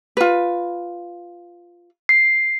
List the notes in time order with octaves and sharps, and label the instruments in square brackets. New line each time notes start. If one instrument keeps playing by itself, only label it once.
[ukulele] F4 B4
[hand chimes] C7